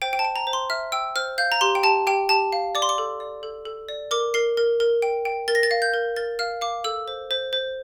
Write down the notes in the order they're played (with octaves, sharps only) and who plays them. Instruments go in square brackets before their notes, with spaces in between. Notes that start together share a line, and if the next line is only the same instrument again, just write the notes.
[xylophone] C5 G5
G5
A5
G5
A#5
C5
C6
E5 F6
G5 E6
C5 F6
F5 G6
A#5
G4 C6
G5
G4 A5
G4 G5
G4 A5
F5
D5 D6
C6
D6
A4
D5
A4
A4
D5
A#4 D6
A#4 C7
A#4
A#4
G5
G5
A#4 A6
A#6
A6
F5
G6
A#4
A#4 A6
F5 F6
F5 D6
A4 E6
C5
C5
C5